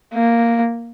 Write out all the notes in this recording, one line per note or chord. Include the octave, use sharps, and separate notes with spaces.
A#3